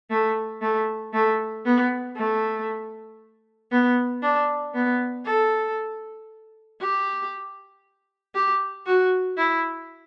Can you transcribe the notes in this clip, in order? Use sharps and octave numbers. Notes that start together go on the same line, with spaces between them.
A3
A3
A3
B3
A3
B3
D4
B3
A4
G4
G4
F#4
E4